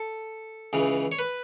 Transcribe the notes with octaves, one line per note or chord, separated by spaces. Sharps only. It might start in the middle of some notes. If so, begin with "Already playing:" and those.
Already playing: A4
C#2 C#3 E3
C#5
B4